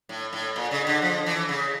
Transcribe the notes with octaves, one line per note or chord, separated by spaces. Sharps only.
A2
A2
A#2
C#3
D3
F3
E3
C#3